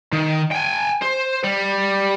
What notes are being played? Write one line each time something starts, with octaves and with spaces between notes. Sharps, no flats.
D#3
G5 G#5
C5
G3